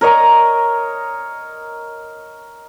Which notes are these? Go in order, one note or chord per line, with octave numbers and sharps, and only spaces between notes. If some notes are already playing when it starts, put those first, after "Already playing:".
A#4 C#5 D#5 A#5